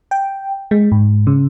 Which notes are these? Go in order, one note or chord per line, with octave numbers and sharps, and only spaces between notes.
G5
G#3
G#2
C#3